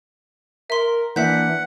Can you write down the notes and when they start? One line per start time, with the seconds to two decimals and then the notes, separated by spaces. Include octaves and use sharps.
0.70 A#4 E5 C6
1.16 E3 A#3 D4 E5 F#5 G6 B6